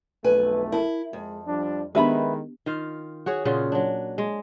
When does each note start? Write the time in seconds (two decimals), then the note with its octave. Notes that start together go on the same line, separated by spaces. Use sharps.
0.24 B1 F2 A3 B4 G#5
0.72 E4 A#4 A5
1.13 F2 G#3
1.47 F3 G3 D4
1.95 D#3 G#3 B3 D4 G4 B4 E5 B5
2.66 D#3 F4 F5
3.26 F#4 G#4 C#5
3.45 A#2 C#3 F4 F#4
3.72 F#3 D4
4.18 G#3